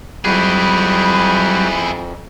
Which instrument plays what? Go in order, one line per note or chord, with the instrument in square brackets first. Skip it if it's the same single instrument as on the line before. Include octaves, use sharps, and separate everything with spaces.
[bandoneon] F2 [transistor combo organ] F#3 G3 [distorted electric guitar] E4 G#4 [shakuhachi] B5